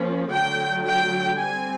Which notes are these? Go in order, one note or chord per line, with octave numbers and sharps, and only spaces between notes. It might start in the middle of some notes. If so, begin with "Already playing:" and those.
Already playing: F3 A#3 C#4
D3 F#3 A3 G5
G5
G3 C4 G#5